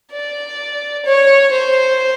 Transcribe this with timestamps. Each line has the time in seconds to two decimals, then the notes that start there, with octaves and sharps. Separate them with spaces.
0.12 D5
1.05 C#5
1.52 C5